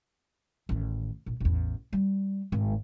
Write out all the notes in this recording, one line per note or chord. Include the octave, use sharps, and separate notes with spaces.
A1 D#3
A#1
A1 E2
G3
G#1